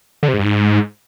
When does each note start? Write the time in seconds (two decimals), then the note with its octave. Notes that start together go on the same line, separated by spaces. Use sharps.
0.23 D3
0.28 C3
0.34 G#2
0.39 G2
0.45 G#2